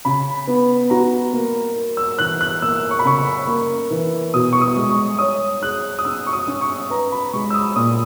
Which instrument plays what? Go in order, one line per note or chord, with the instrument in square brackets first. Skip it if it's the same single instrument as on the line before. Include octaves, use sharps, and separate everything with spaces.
[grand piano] C#3 [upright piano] B5
[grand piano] B3
[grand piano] F#4 [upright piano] A#5
[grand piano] A#3
A#4
[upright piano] E6
[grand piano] E3 [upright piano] F#6
[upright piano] F#6
[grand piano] A#3 [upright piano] E6
[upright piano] C#6
B5
[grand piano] C#3 [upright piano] C#6
[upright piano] C#6
[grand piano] A#3
E3
[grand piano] B2 [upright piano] D#6
[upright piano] C#6
D#6
[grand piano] G#3
[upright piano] C#6
[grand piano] C#5 [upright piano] D#6
[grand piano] G#4 [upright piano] F#6
[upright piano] D#6
[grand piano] C#4 [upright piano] E6
[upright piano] C#6
D#6
[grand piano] C#4
[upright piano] C#6
[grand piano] B4 [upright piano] A#5
[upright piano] B5
[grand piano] G#3 [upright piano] C#6
[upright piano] E6
D#6
[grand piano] A#2 [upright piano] D#6